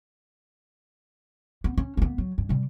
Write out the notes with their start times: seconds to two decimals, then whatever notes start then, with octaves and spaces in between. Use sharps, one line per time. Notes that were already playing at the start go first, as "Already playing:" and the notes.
1.64 B3
1.78 C#4
1.97 A#3 B3
2.18 F#3
2.38 G2
2.49 C3 G3